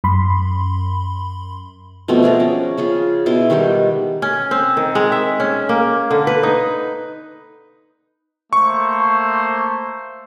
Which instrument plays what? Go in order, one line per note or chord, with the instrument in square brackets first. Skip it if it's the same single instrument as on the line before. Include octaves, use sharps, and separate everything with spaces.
[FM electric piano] F#2 B5 C6
[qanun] B2 F3 A3 C4
C4 G#4 D5 A#5
C#4
C#3 F4 G#4
B2 E4 C6 D6
D#3 G3 G#3 G4
[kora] C#4
C4
D#3
G#3
E5
C#4
A#3
D3
B4
D#4
[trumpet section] A3 A#3 C5 [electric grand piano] C#6